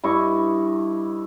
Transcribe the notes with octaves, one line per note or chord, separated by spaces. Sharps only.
G2 E4 D#5 C#6